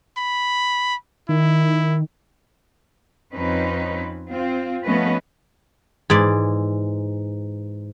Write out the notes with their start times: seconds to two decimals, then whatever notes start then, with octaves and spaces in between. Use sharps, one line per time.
0.18 B5
1.29 D#3 E4
3.33 F2 C4 C#4 D#4 B4
4.29 C4 F4
4.85 F3 A3 B3 C#4 B4 D#5
6.10 G#2 E3 D5